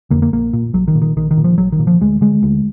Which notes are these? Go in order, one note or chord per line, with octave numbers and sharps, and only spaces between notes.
F2 D3 A#3
A#3
A#1 A#3
A#2
A#1 F#3
D#3
A#2
D#3
A#1 D#3
D#3
A#2
F3
A#1 F#3
D#3
A#2
F3
D2 G#3
D3 G#3
D2